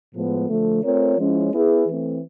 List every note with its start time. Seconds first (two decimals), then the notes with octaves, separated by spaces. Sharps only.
0.13 A2 F3 G#3 B3
0.47 D3 F3 A3
0.82 A3 C4 F4 A#4 C#5
1.16 F3 G#3 C#4 E4
1.51 B3 E4 G#4 B4
1.86 E3 A3 C4